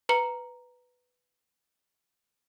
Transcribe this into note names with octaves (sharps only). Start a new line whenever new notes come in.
B4 A#5 C#7 F#7